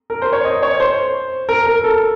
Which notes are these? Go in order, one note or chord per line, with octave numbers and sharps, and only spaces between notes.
A#4
C5
C#5
D#5
C#5
C5
A#4
A#4
A4